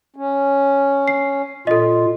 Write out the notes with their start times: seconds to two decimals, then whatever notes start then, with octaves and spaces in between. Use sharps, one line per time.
0.16 C#4
1.08 C7
1.67 A#2 F4 A4 D#5